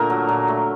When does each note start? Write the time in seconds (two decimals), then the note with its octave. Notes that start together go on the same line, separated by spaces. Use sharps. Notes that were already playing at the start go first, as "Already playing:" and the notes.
Already playing: A#2 D3 A3 A#4
0.10 F#3
0.29 A#2
0.48 A3